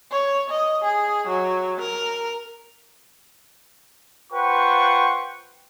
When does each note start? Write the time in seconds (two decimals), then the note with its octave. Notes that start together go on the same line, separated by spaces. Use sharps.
0.12 C#5
0.50 D#5
0.84 G#4
1.28 F#3
1.81 A#4
4.33 F4 B4 C5 F#5 G5 C#6